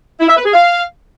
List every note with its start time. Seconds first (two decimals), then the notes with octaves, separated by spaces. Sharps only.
0.20 E4
0.28 E5
0.37 B4
0.45 G#4
0.54 F5